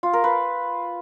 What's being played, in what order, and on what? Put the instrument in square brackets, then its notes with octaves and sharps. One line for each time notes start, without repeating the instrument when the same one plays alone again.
[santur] F4
A#4
B4